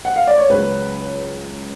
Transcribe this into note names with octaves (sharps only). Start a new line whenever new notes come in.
F#5
F5
D5
C#5
C#2 C#3 F#3 B4